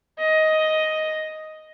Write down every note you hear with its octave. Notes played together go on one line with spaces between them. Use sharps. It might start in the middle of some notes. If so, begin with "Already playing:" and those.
D#5